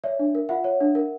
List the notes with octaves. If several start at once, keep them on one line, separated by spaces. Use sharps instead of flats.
C#5 D5 E5
D4
A#4
F4 E5 F#5
C#5
D4
A#4